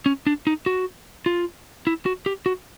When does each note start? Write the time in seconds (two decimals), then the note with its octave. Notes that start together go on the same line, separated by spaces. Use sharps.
0.06 C#4
0.27 D4
0.47 D#4
0.66 F#4
1.26 F4
1.87 E4
2.06 F#4
2.26 G4
2.46 F#4